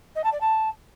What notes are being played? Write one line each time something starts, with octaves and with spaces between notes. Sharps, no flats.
D#5
A5
D5
A5